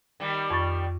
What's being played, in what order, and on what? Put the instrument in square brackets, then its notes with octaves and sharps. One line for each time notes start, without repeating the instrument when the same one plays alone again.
[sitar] D#3 G3
[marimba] F2 C#6 A6